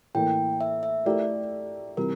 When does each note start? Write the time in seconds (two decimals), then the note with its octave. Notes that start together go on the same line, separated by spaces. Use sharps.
0.15 A2 E3 A#3 G5
0.61 E5
0.83 E5
1.06 A3 E4 G4 A#4 D5
1.97 C3 E3 G3 A#4